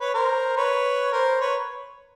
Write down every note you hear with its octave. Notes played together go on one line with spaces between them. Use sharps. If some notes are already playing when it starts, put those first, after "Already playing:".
B4 C#5
A#4 C5
B4 C#5
A#4 C5
B4 C#5